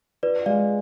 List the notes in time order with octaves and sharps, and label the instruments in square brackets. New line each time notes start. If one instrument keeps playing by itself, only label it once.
[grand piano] F4 [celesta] B4 D5
[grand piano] G#3 [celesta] D5 F5